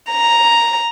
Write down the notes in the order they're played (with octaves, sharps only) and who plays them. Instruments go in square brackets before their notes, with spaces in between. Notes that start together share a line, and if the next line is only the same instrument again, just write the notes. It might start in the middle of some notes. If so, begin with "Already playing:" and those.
[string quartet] A#5